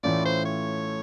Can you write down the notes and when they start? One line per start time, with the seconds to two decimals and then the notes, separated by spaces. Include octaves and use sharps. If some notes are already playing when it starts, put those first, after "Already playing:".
0.03 A2 E3 A3 C#4 F4 D5
0.25 C5
0.45 C#5